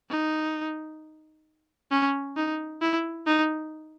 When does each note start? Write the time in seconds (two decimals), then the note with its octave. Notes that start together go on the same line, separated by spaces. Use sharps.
0.10 D#4
1.91 C#4
2.36 D#4
2.81 E4
3.27 D#4